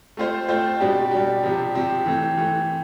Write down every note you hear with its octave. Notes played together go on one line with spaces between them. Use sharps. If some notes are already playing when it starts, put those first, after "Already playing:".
A3 C4 F4 C5
A3 C4 F4 C5
B2 G3 D4 G4
B2 G3 D4 G4
C3 F3 C4 G4
C3 F3 C4 G4
E3 A3 C4
E3 A3 C4